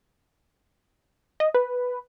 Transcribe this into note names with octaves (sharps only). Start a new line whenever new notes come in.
D#5
B4